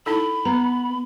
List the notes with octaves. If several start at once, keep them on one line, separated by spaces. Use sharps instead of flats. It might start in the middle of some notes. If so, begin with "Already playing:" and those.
D#4 E4 A4 B5
B3 A#5